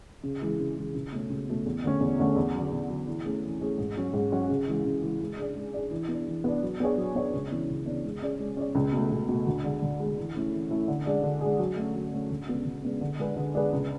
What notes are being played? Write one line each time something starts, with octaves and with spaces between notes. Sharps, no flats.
C#3
E3 G#3
C#3
E3 G#3
C#2
B2 A3 C#4
C#2
B2 A3 C#4
E2
D3 A3 C#4
E2
D3 A3 C#4
E2
D3 F#3
E2
D3 F#3
E3
A3 C#4 G#4
E3
A3 C#4 G#4
G#2
F#3 C#4 F#4
G#2
F#3 C#4 F#4
C#3
E3 G#3
C#3
E3 G#3
G#3
D4 G#4 D5
G#3
D4 G#4 D5
E3
B3 D4
E3
B3 D4
F#3
B3 D4 G#4 C#5
F#3
B3 D4 G#4 C#5
C#2
C#3 E3 B3 D4
C#2
C#3 E3 B3 D4
G#3
C#4 G#4 D5
G#3
C#4 G#4 D5
C#2
B2 A3
C#2
B2 A3
D2
D3 G#3
D2
D3 G#3
E3
A3 C#4 E4
E3
A3 C#4 E4
D3
G#3 D4 G#4
D3
G#3 D4 G#4
F#3
A3 C#4
F#3
A3 C#4
D2
C#3 G#3 B3 D4
D2
C#3 G#3 B3 D4
D3
G#3 D4 G#4 B4
D3
G#3 D4 G#4 B4
C#2